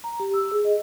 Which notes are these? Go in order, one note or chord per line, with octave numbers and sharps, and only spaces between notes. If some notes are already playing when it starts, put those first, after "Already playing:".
A#5
G4
E6
G#4
D#5